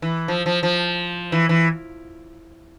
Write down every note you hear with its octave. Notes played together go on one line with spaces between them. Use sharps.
E3
F3
F3
F3
E3
E3